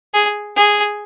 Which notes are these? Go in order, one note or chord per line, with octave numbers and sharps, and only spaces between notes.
G#4
G#4